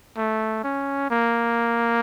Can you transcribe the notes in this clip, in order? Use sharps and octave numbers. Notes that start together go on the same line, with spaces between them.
A3
C#4
A#3